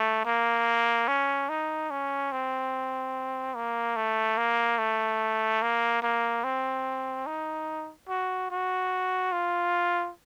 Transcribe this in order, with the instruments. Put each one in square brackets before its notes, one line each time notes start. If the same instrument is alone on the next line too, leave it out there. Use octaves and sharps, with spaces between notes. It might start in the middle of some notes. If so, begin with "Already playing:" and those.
Already playing: [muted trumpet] A3
A#3
C#4
D#4
C#4
C4
A#3
A3
A#3
A3
A#3
A#3
C4
D#4
F#4
F#4
F4